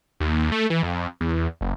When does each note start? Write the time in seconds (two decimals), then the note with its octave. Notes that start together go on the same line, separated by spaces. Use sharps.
0.20 D#2
0.52 A3
0.70 E3
0.83 F2
1.21 E2
1.61 F#1